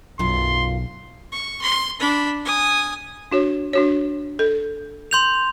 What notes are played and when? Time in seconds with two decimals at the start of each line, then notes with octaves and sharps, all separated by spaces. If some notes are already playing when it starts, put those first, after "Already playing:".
0.19 B1 F#2 F4 C6
1.32 C#6
1.62 C6
2.00 D4 B5
2.45 G#5 D#6
3.31 D4 F#4 C#5
3.73 D4 F#4 C#5
4.39 A4
5.11 C6 G6 F7